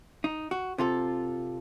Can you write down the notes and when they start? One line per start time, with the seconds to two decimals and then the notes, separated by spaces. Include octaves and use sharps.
0.24 D#4
0.51 F#4
0.78 C3 F4 A4